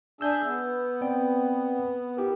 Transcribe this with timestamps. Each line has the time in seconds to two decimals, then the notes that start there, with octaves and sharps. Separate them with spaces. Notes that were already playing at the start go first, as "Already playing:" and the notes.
0.21 D4 G#4 E5 E6 G6
0.45 B3
1.01 C4 D5 G5
2.17 E4 G4 A#4